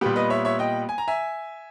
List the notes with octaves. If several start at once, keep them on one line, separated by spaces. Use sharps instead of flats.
A#2 G3 B3 G4
B4 D#5
C#5 E5
C#5 E5
D#5 G5
G#5
A#5
E5 G#5